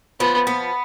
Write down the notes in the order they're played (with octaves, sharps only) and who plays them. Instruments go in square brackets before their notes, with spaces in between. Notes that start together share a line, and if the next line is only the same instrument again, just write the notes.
[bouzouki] F3 [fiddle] B3
[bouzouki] B3